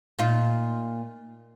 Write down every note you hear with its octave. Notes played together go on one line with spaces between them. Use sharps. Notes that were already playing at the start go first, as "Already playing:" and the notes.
A#2 D#4 F4